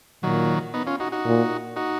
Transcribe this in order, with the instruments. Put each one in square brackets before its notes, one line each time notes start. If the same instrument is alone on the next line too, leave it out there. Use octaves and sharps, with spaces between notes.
[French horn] A#2 [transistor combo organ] D#3 F#3
[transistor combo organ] B3 D#4
C#4 F4
D#4 F#4
D#4 F#4
[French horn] A#2
[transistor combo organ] D#4 F#4